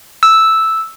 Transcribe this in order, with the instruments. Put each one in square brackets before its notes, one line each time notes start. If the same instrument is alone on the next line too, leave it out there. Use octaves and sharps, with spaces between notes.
[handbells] E6